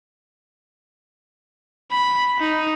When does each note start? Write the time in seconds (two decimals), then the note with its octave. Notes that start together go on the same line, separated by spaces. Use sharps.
1.91 B5
2.40 D#4